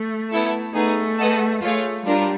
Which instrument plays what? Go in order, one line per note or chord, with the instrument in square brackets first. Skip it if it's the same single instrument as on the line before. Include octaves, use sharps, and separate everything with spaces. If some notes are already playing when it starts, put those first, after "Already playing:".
Already playing: [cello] A3
[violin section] B3 E4 A4
[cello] A3 [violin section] B3 D#4 G#4
[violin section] G#4 B4 D#5 F#5 A5
[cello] A3 [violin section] F4 G#4 C#5 F5
[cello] G3 [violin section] D4 F4 A#4